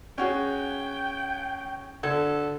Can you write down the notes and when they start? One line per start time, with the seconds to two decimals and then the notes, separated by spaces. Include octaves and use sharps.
0.18 C#4 F#4 G#4 G5
2.03 D3 A4 G#6